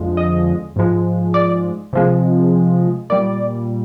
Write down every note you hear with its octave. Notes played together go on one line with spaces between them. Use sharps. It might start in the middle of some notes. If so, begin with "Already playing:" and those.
Already playing: F2 D3 F3 G#3
D#5
G#2 F3 G#3
D5
C3 F3 G#3
A#2 G3 D5